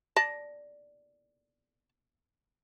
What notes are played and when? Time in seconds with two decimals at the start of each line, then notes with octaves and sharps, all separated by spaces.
0.16 D5 A5 A#6